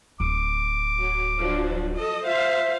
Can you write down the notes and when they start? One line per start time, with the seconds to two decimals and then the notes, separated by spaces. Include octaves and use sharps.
0.20 D1 D6
0.99 F#3
1.38 F3 F#3 D4
1.96 A4 D#5
2.25 F4 C5 E5 F5